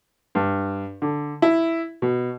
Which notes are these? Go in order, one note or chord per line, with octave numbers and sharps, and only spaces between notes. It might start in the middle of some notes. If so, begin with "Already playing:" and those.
G2
D3
E4
B2